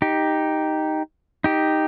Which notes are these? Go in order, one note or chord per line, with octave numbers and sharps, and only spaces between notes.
D#4 G4
D#4 G4